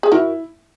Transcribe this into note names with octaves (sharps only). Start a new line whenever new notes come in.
G#4
E4 F#4 A#4